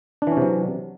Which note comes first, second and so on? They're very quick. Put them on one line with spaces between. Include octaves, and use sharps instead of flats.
D4 E3 C#4 C3 F#3